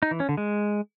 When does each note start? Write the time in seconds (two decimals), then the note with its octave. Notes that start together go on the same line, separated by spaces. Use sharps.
0.03 D#4
0.11 E3
0.20 C#4
0.29 D3
0.37 G#3